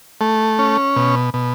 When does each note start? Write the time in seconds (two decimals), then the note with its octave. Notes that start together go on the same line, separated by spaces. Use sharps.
0.21 A3
0.59 C#4
0.96 B2
1.34 B2